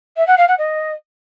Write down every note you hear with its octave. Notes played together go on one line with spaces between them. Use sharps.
E5
F#5
F5
F#5
D#5